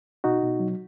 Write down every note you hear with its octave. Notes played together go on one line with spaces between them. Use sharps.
B2 D#4 F#4
B2
F#3